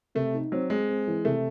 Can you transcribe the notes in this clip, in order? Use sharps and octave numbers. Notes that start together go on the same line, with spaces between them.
C3 A3
D#4
F#3 C4
G#3 C4
C4
E3
C3 A3